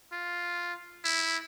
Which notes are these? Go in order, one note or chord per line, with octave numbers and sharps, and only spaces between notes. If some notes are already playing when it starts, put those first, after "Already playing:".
F4
E4